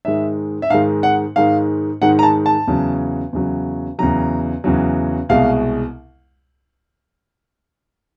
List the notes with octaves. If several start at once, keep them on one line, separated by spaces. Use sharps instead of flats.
G#2 D#3 G#3 E5
E5
G#2 D#3 G#3 F5
F#5
G#2 D#3 G#3 F5
G#2 D#3 G#3 F#5
A#5
A5
A5
E2 C#3 F#3
E2 C#3 F#3
E2 C#3 F#3 A#5
E2 C#3 F#3
C2 B2 G#3 F5